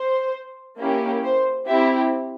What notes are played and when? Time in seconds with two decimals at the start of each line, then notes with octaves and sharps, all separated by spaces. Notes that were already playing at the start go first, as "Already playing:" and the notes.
Already playing: C5
0.78 A#3 C#4 E4 G4
1.23 C5
1.66 C4 E4 G4 E5